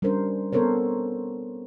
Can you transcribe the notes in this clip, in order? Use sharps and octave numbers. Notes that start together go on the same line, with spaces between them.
G3 C#4 D4 A#4 C5
B3 C4 A4 A#4 C5 C#5